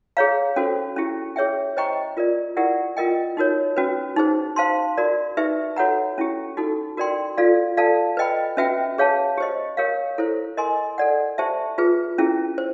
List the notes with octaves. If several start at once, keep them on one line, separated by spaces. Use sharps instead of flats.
G#4 C#5 F5 A#5
C#4 F#4 A4 C5
C#4 E4 G4
G#4 C#5 E5 G5
C5 D#5 G5 A#5 C#6
F4 A#4 D5
E4 G4 A#4 D5 F#5
F4 A#4 D#5 G5
D#4 F#4 A#4 C#5
C#4 F#4 B4
D#4 G#4 C5
C5 F5 A5 C6
F#4 A#4 D5
D#4 G4 B4 E5
F#4 A4 C#5 F#5 A#5
C#4 E4 G4
D#4 F#4 A4
F#4 A#4 D5 G5 C6
F4 A4 D5 F5
A4 D5 F5 A5
B4 D#5 G5 B5
C#4 F#4 B4 E5 G5
G#4 C#5 F5 A5
G4 C5 D#5
G4 A#4 C#5 F5
E4 A4 C5
A#4 D#5 G#5 C6
A4 D5 F#5
G4 C5 E5 A5
F4 G#4 B4
C#4 E4 G#4
C5